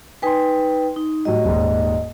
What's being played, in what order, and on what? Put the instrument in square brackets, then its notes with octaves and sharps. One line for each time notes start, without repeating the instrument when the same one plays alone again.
[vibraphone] D#4 B4 G5 [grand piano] G#5 C6
[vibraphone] D#4
[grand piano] A2 F#3 G3 [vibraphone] D#5
[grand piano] D#1 D#2 G#2